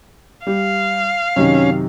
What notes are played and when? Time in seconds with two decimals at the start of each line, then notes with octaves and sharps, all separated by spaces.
0.47 G3 F5
1.36 F#2 C3 D#3 C#4